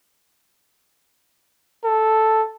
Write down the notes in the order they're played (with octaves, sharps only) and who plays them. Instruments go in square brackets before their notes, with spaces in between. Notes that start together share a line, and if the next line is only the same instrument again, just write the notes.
[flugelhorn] A4